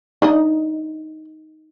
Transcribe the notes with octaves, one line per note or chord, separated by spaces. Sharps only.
D4 D#4 D5 D#5